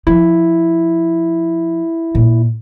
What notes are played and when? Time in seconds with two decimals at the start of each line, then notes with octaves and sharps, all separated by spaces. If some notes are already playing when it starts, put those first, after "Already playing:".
0.07 F3 E4
2.15 A#2